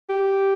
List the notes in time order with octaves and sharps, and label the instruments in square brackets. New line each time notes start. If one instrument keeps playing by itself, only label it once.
[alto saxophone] G4